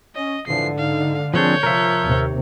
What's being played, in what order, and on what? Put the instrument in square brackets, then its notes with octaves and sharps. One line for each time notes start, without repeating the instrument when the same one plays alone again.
[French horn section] C#4 [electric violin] D#5
[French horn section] F2 E3 F3 [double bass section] G#2 D3 [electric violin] C7
[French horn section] D#4 [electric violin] F5
[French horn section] A#2 G#4 [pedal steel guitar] F3 C4 D4 [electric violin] C#5 G6
[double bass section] C3 [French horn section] F3 [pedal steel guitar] A#4 E5
[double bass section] D#2 C3 A#3